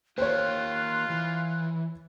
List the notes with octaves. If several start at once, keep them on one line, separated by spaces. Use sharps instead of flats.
A#3 F4 G4 C5 C#5 F#6
E3